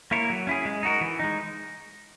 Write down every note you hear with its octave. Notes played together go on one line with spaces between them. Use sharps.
A#3 E4 A#4 C#5
F#3
C#4 E4 G#4
G#3
D#4 F#4 A#4
E3
G#3 D#4